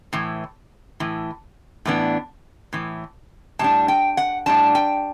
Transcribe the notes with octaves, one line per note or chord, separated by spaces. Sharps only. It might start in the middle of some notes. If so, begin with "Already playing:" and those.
A2 E3
A2 E3
A2 E3 B3 D4
A2 E3
A2 G3 D4 A5
G5
F#5
A2 G3 D4 A5
G5